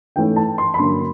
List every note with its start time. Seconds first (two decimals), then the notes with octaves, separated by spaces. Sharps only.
0.16 G#2 E3 A3 C#4 G5
0.36 A5
0.58 C6
0.74 B5
0.79 G2 D3 F#3 A#3 C#4 C6